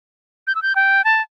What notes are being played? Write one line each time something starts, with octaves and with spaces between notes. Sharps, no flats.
G6
E6
G6
G5
A5